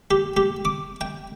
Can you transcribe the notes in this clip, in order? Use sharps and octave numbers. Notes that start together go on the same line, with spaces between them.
G4
G4
D6
G5